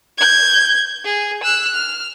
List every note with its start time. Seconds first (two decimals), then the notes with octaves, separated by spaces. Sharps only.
0.18 G6 G#6
1.05 G#4
1.43 E6 F#6
1.75 F6